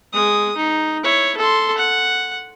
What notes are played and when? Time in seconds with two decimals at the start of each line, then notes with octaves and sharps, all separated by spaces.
0.13 G#3 D#6
0.57 D#4
1.04 E4 C#5
1.37 A4 C6
1.77 F#5